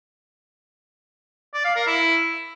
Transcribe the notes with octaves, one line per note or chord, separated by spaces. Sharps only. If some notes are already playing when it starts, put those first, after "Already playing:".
D5
F5
A#4
E4